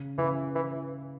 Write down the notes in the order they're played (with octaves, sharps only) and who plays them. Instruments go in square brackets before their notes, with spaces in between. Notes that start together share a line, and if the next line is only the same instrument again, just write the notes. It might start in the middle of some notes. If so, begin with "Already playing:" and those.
Already playing: [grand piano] C#3
[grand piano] C#3 [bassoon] E3
[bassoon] E3